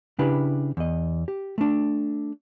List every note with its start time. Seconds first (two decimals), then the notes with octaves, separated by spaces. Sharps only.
0.19 C#3 D4 E4 G4 B4
0.77 E2 D#5
1.28 G4
1.58 A3 D4